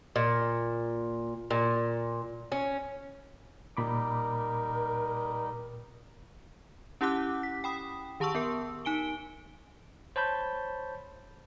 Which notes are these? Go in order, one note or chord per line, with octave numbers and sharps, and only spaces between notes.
A#2
A#2
C#4
A#2 G3 D#4 A#4 B5 D6
C#4 E4 G4 F#5 D6 F#6
B6
G5 B5 D#6
D#3 G4 A5 C6 C#6 E6
B3 A#4
D#4 G#5 D7 G7
C5 C#5 A5 B5 G6